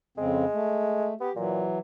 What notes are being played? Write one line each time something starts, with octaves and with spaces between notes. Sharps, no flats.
F2 C#3 G#3 C4
A3
B3 G4
A#2 E3 F#3